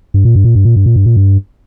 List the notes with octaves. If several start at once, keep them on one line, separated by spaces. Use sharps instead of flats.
G2
A#2
G2
A#2
G2
A#2
G2
A#2
G2
A#2
G2